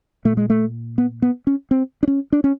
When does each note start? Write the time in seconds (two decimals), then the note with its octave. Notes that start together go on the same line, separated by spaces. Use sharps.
0.25 A#2 A3
0.37 G#3
0.50 A3
0.98 B3
1.22 B3
1.47 C#4
1.71 C4
2.03 D4
2.08 C#4
2.32 D4
2.44 C#4